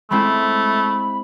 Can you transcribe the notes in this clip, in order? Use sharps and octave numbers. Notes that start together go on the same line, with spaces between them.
G#3 A3 C4 E4 B5